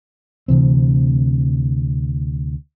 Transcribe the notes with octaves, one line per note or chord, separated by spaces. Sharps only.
D2 C3 E3 C4